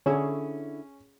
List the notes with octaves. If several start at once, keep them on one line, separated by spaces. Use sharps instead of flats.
D3 C#4 E4 G#4 C#5